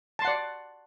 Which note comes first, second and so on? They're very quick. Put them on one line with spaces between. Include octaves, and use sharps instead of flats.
A5 C6 F#5 D5